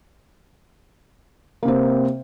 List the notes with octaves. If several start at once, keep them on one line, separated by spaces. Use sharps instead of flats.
C3 A#3 C4